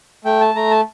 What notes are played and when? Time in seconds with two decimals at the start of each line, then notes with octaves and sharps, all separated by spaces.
0.25 A3 G5
0.41 A5
0.55 A3 A#5
0.71 A5